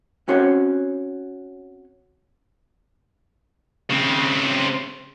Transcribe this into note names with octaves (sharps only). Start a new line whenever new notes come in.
C4 C#4 F#4 C5 C#5
C#3 C4